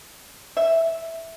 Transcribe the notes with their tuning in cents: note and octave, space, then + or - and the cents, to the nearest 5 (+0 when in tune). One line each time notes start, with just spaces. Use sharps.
E5 +0